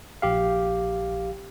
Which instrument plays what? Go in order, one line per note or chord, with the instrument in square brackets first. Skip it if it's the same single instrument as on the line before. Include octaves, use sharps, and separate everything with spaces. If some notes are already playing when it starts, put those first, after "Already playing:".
[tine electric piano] A#1 G4 F5